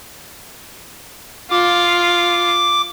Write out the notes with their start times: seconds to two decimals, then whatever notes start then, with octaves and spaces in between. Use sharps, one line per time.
1.51 F4 D6